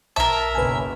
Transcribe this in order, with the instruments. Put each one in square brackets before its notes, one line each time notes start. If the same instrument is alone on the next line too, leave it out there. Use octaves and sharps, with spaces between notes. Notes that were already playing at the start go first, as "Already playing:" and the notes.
[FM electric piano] B1 A5 [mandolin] A#4 E5
[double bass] F#1 B1 [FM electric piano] B4 G#5